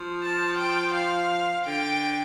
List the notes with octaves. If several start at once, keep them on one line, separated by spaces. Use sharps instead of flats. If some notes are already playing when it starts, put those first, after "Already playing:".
Already playing: F3
A5
G5
F5
D3 G5